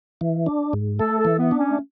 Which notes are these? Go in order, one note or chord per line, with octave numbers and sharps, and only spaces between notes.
E3
D4
G#2
A3 A4
A4
E3
B3
D4
C#4
A3